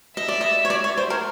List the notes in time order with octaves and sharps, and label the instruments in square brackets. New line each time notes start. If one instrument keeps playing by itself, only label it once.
[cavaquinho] D#5 [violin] E5
[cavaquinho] D5
D#5
C#5
D5
C#5
C5
A#4